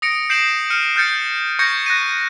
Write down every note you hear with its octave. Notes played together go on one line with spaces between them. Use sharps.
D#6 A#6 C#7 D7
G6 C7 D7 E7 F#7
F6 C#7 D#7
F6 G6 A6 C#7
C#6 G6 G#6 A#6 C#7
F#6 A#6 D#7